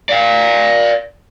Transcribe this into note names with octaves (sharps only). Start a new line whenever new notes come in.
D5 F5